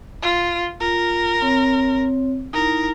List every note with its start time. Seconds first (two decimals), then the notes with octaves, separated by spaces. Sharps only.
0.22 F4
0.80 F4 A#4
1.42 C4 C#5
2.53 D#4 E4 A#4